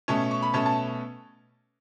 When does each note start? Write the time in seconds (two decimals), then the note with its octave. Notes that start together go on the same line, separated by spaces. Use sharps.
0.08 B2 A3 C#4 A5
0.31 C#6
0.43 B5
0.54 B2 A3 C#4 A5
0.66 A5